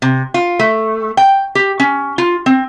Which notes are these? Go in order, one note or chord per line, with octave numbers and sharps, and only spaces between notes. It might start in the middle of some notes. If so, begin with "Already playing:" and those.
C3
F4
A3
G5
G4
C#4
F4
C4